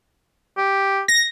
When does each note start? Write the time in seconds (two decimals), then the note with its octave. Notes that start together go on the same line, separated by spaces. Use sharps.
0.57 G4
1.08 A#6